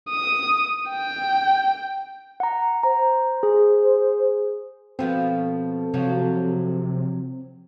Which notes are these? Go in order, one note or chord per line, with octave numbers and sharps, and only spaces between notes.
D#6
G5
F#5 A#5
C5 A#5
G#4
B2 F3 B3 C4 A4
C3 F3 F#3 F#4